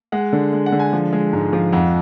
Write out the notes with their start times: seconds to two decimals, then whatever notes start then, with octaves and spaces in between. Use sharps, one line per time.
0.12 G#3 F#5
0.33 D3
0.53 G#3
0.66 F#5
0.72 D3
0.79 G#5
0.93 F3
1.13 G#3
1.33 G#2
1.53 F3
1.73 F2 F#5